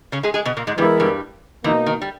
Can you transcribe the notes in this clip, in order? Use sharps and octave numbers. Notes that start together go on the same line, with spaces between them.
C#3 C#4
G#3 G#4
G#3 G#4
B2 B3
A#2 A#3
G#2 G#3
G2 E3 G3 G#3 B3 E4 A#4
G2 G3
E2 B2 E3 A#3 D#4
D#3
G3